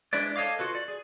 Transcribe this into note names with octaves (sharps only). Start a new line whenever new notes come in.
G#3 D4 E4 B4 D5
A4 C#5 D#5 F5 D6
F4 F#4 A4 B4
D5
G#4